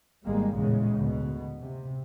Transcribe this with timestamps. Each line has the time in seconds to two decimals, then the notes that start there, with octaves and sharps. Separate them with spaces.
0.24 G#1 G3 G#3 A#3
0.55 A1 E2 A#2 C#3 G#3
0.94 D2 B2
1.61 C3